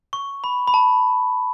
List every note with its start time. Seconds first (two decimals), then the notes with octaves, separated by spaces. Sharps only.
0.13 C#6
0.44 B5
0.67 B5
0.74 A5